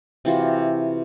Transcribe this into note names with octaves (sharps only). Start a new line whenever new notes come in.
C3 E3 F4 F#4